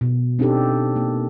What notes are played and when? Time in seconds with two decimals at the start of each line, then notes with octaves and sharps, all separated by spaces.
0.01 B2
0.39 C4 D4 D#4 G4 A4
0.96 A#3